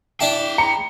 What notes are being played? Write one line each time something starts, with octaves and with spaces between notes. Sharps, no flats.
D4 E4 G#4 G5 A5
A#5 B5 C#7